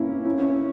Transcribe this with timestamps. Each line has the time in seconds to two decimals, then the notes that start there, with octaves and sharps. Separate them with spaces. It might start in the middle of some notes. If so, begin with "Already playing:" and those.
Already playing: A#3 C#4 E4
0.25 C#4 E4
0.40 C#4 E4